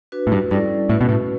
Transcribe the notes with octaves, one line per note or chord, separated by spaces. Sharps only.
D4 F#4 B4
A2
G2
G2 G3 C#4 E4 A4 D5
A2 A3 C#4 F#4 B4
B2
A2